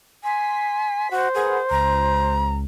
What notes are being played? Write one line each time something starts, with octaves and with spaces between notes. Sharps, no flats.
G#5 C6 B6
F#4 C5
G#4 A#4 B4 F#5
C#2 A#5